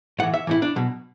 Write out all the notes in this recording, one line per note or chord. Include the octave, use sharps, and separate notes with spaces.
A2 E3 F#5
E5
A2 E3 E4
D4
B2 F#3